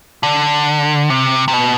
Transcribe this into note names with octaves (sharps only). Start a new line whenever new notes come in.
D3
C3
C3
B2